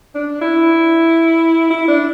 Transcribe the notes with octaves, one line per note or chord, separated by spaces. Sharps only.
D4
E4
E4
D4